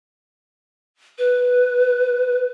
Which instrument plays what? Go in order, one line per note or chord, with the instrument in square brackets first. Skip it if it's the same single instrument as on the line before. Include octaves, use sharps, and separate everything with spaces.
[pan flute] B4